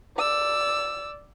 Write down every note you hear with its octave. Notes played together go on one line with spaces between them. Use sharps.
D5 E6